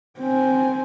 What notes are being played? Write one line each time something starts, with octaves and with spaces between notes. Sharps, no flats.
C4 G#5